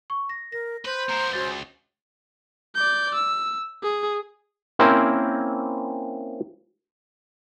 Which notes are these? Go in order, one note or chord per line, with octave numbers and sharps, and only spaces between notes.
C#6
A#6
A#4 A#6
B4 C5
B3 A#4 A#5 C7 E7
C#2 F#4 A6 G7
D5 G6
E6
G#4
A#3 C4 C#4 E4 A#4 C5